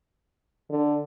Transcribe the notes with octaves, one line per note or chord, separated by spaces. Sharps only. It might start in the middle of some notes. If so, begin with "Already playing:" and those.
D3